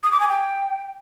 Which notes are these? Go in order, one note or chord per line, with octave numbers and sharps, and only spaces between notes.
D#6
D6
G#5
G5